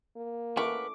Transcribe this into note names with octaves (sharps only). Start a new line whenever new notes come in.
A#3
A#4 B4 F#5 D6